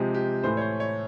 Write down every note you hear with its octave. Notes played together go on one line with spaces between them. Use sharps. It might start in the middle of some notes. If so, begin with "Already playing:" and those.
Already playing: C3 F3 G#3 G4
G4
A2 E3 A3 C5
C#5
C5
C#5